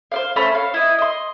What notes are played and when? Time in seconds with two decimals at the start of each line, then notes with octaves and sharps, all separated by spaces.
0.12 C5 D5 F5
0.36 A3 C#4 C5 B5
0.52 C#5 F5
0.74 E4 D#5
0.98 D#5 C6